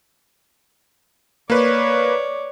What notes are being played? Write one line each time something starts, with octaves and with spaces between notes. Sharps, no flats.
A#3 B4 C#5 D5